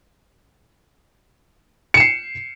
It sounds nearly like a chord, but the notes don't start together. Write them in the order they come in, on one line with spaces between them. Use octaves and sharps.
C#7 E7 C7